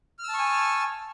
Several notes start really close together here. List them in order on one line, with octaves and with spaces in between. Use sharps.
F6 E6 A5 C#6 G#5